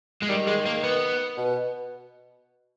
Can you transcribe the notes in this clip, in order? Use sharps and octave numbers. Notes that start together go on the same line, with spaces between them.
G#3
D#3 G3
G#3
A#3
B3
B2